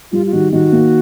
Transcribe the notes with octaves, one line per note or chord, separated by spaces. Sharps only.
G3 F4
F4
D#3 F#4
D#3 F#4
A#3